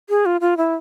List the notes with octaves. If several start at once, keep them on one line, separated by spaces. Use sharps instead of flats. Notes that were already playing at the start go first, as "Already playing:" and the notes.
G#4
F4
F4
E4